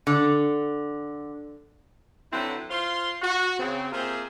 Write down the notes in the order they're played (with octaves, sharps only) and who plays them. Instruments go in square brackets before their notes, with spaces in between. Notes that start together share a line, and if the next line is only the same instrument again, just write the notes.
[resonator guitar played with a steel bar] D3
[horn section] D3 F#3 C4 E4 A4 B4
F4 C5 F5 C6
F#4
C#3 C4
C3 A#3 F4 G4 G#4 C5